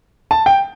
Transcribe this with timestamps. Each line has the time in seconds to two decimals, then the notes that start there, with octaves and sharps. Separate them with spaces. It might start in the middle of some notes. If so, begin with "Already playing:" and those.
0.31 A5
0.46 G5